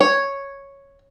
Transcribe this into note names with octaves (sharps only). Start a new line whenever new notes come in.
C#5